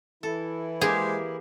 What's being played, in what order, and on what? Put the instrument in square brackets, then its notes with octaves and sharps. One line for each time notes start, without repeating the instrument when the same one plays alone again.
[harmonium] E3 E4 [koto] A4
[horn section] G#3 C5 [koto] A#3 G4 A#4 [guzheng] G#4